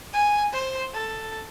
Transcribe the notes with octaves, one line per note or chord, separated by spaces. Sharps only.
G#5
C5
A4